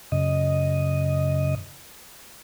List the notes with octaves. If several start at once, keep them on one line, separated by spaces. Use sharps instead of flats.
F#2 C#3 D#5